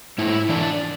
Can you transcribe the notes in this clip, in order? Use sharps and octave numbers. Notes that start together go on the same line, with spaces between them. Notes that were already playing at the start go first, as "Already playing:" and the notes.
G#2 E4
E3 D4